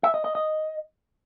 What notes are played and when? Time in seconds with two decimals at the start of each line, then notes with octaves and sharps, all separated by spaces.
0.03 E5
0.14 D#5
0.25 D#5
0.35 D#5